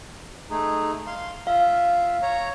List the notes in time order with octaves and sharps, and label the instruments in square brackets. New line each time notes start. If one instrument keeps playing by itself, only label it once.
[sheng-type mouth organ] A3 D#4 G#4
F5 C6
[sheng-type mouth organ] F4 E5 [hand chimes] F5
[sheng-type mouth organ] C#5 A#5